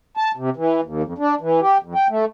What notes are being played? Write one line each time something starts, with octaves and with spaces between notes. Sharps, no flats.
A5
C3
E3
D#2
F2
D4
E3
G4
F2
G5
A3